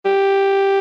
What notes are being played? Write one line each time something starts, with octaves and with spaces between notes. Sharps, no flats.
G4